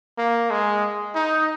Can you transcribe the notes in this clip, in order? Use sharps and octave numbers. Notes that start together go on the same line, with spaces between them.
A#3
G#3
D#4